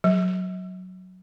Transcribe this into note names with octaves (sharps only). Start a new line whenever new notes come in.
F#3